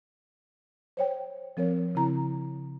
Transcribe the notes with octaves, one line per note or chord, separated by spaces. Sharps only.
C5 C#5 G5
F3 C4 A#4 C#5
C#3 C4 E4 A#5